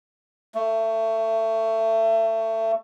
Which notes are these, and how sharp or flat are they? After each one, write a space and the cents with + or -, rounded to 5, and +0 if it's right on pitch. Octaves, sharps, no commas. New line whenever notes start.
A3 +25